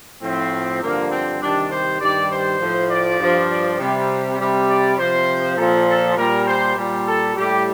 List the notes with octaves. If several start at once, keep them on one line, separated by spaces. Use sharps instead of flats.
A2 F3 C4
G2 D3 F3 A#3
C4
C3 D#3 G3 D4
C5
G2 D#3 G3 D5
C5
A2 F3
D5
G2 F3
D5
C3 G3
C3 G3
D5
C3 F3 C5
A#2 F3 A4
A4
A#2 G3 A#4
C5
A#2 G3
A4
A2 G3 G4